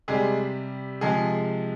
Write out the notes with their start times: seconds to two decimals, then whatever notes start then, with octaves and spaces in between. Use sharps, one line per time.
0.08 C3 G3 G#3 G#4
1.01 C3 F3 G#3 G#4